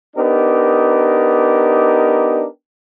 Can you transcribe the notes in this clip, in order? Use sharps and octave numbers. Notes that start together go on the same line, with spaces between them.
B3 D4 D#4 G4 A#4